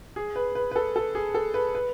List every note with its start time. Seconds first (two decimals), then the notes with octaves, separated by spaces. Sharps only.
0.16 G#4
0.36 B4
0.55 B4
0.71 B4
0.76 A4
0.96 A4
1.15 G#4
1.34 A4
1.54 B4
1.75 B4